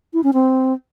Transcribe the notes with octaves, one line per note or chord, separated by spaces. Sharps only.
E4
C#4
C4